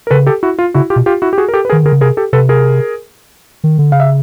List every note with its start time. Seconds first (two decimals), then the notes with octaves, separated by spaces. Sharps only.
0.07 A#4
0.10 C#3 A4 B4
0.27 G4 A4
0.43 E4 F#4
0.59 F4
0.74 C#3 E4 F#4
0.90 F4 G4
0.96 B2
1.06 F4 G4
1.22 E4 F#4
1.33 G4
1.38 F#4 G#4
1.49 A#4
1.54 G4 A4
1.65 B4
1.69 D#3 G#4 A#4
1.83 D3 G#4 A#4
1.92 C#3
2.01 C3 G#4 A#4
2.17 G4 A4
2.33 C3 A4 B4
2.49 G#4 A#4
3.64 D#3
3.78 D3
3.92 C#3 F5
4.00 E5